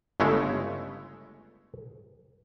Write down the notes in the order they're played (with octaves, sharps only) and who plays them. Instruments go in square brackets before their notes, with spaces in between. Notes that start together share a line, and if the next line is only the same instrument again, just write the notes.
[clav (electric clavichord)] G1 C#3 G#3 A3 E4 C#5